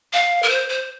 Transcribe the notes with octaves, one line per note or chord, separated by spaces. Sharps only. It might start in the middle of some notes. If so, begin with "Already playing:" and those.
F5
A#4
C5
C5